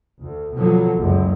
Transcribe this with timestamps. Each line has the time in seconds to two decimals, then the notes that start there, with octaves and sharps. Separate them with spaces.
0.20 D2
0.54 B2 D3 F3 F#3
0.96 F#1 C#2 F#2